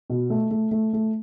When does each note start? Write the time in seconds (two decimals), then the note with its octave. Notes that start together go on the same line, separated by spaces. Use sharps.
0.10 B2
0.30 A3
0.51 A3
0.71 A3
0.93 A3